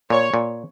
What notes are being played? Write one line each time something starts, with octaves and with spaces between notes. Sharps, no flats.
A#2 C#5
A#2